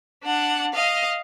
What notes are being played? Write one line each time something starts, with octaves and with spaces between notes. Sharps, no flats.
D4 F#5
D#5 F5